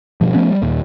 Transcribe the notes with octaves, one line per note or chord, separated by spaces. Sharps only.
G2 B2 F3
F3 A3 B3 C#4
G3
D#2 A#2